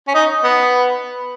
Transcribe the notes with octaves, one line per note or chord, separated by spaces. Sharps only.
C#4
D#4
B3